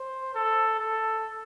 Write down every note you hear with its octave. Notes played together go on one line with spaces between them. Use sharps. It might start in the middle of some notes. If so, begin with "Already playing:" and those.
Already playing: C5
A4
A4